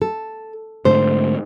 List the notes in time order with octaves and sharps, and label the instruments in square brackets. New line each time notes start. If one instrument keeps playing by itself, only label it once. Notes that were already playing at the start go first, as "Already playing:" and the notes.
[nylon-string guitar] A4
[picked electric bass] G#2 D3 A3 [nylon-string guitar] C5